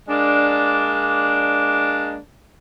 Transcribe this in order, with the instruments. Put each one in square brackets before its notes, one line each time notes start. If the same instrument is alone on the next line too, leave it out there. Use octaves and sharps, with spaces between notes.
[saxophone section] G#3 A#3 D4